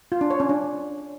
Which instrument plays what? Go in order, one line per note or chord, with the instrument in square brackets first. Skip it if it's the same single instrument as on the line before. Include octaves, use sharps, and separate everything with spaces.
[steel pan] F4
D4
C#5
C#4
D4